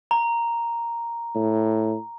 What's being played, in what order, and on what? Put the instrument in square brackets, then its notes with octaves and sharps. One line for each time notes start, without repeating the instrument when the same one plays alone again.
[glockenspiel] A#5
[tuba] A2